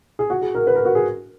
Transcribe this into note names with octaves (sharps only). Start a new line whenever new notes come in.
G#4
F#4
G#4
A#4
B4
A#4
F#4
G#4